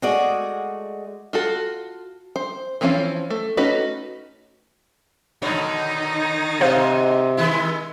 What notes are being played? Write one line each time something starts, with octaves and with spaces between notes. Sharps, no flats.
G#3 A3 F#4 G#4 D5
F4 F#4 A4
C5
E3 F3 C4 C#4 F5
A3
A3 C#4 D#4 F#4 B4
B2 D3 D#3 D#4 C#5
G#2 C3 C5 D#5 F5
D#3 G#3 E4